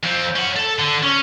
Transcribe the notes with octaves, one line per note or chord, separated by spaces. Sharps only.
F2 C4
C#4 F#5
A4
D3
C#4